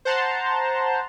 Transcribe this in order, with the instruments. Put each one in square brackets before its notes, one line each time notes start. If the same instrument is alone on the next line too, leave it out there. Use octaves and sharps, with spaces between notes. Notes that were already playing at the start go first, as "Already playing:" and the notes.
[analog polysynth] C5 F#5 A5 A#5 C6